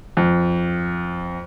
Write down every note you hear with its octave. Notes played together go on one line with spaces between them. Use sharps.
F2